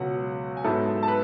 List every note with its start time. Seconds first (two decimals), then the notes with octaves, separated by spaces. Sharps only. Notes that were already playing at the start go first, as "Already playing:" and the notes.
Already playing: C#2 B2 F#3 C#4 F#4 F#5
0.57 G#5
0.64 G#2 F#3 B3 E4 A4 A5
1.03 A5
1.08 B4 B5